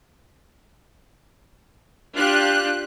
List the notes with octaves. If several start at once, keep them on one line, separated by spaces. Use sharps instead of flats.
D4 F4 G4 F#6